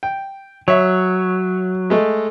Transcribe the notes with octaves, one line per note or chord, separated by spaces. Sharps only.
G5
F#3 C#5 E5
G#3 A3